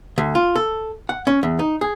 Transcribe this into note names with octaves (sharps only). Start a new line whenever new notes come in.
D2
F4
A4
F#5
C#4
E2
D#4
G#4